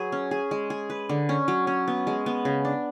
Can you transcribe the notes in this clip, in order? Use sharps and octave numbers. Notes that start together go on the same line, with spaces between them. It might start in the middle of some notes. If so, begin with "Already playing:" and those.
Already playing: F#3 G#4 B4
C#4
G#4
G#3
G#4
B4
D3
C#4
F#3
C#4
B3
G#3
B3
C#3
D4